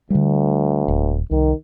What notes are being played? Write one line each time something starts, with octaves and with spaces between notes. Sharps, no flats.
D2 D3 G3
D#1
C2 D#3